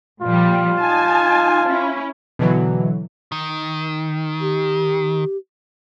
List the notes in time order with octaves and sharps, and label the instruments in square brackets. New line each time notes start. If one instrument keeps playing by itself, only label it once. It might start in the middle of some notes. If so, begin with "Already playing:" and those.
[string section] A#2 F3 G3 [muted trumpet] F4
[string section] D#4 G#5 A5
C#4 E4
[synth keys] B2 D3 E3 F#3
[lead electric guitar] D#3
[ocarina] G4